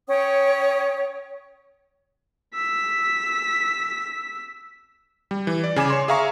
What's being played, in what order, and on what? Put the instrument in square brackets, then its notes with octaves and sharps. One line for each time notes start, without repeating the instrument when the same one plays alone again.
[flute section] C#4 C#5 G5 D#6
[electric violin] E6 B6
[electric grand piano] G3
E3
D5
C#3 G#5 D6 E7
C#5 C6
G#4 E5 F5 A#5 C#6